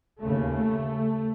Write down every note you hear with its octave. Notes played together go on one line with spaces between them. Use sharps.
D#2 C#3 A3
A3